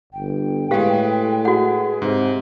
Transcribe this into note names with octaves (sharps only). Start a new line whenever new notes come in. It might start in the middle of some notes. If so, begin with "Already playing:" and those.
G1 G5
A2 G#3 G4 B4 F5
F#4 G#4 F#5
G#2 C3